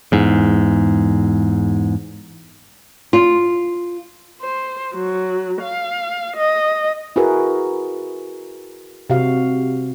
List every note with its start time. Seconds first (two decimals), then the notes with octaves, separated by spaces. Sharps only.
0.12 E2 G#2
3.13 F4
4.41 C5
4.94 F#3
5.62 F5
6.36 D#5
7.16 E4 F#4 G#4 A#4 B4
9.10 C3 F#4 F5